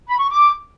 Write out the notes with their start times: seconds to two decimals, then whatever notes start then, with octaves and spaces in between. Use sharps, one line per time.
0.09 B5
0.19 C#6
0.30 D6